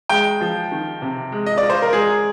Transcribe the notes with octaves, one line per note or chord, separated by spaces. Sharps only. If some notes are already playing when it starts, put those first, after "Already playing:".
G#3 G5
F3
D#3
C3
G#3
D#5
F4 D5
C5
A#4
G#3 G#4